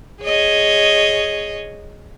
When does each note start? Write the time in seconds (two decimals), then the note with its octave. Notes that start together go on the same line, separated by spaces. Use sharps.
0.22 G#4 C#5 D#5